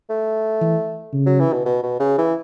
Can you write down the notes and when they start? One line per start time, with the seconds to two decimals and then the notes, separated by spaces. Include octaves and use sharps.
0.10 A3
0.61 E3
1.13 C#3
1.26 F#3
1.40 E3
1.53 B2
1.65 B2
1.83 B2
2.00 C#3
2.18 E3